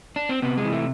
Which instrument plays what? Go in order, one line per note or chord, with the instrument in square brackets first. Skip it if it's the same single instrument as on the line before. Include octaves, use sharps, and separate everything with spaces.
[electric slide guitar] D4
C4
C3 B3
G#3
E3
A3